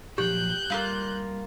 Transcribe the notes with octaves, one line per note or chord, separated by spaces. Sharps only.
A#2 F3 F#3 G4 G5 F#6 G6
G3 A#3 E4 F4